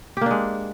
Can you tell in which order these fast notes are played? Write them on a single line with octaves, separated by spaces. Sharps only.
G4 A#3 D4 G#3